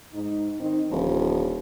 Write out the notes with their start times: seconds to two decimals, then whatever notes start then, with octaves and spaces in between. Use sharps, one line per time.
0.14 G#2 D#4
0.60 D#3 C4 D#4
0.91 D#1 D3 F3